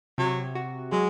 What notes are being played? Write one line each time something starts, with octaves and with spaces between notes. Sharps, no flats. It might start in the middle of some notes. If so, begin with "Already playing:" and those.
C3 F#3
F#4
F#3 G#3